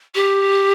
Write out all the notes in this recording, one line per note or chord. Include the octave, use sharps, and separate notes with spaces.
G4